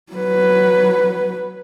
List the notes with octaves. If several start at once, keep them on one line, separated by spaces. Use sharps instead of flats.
F#3 B4